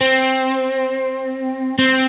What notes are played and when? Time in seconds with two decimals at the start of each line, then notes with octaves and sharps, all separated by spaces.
0.01 C4
1.79 C4